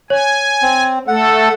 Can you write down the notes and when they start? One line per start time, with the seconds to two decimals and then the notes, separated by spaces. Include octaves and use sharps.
0.10 C#5 G#5
0.62 C4
1.07 A3 A4 F#5